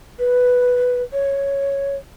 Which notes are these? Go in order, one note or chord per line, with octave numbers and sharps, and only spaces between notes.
B4
C#5